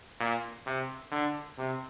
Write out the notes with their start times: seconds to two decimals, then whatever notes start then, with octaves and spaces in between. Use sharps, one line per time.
0.20 A#2
0.66 C3
1.11 D3
1.58 C3